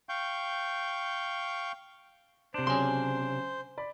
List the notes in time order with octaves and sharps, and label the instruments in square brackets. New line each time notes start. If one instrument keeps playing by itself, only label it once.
[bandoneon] F5 G5 C#6 G6
[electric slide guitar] C3 D4 [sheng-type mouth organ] C5
[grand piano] C#3 F#3 C#4 [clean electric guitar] G#5 C6
[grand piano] D5 B5